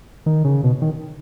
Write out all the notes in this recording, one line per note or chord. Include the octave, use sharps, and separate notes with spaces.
D#3
C#3
B2
D#3